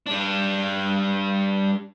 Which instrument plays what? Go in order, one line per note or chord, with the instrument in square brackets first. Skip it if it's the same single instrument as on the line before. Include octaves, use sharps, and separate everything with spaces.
[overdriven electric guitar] G3 D4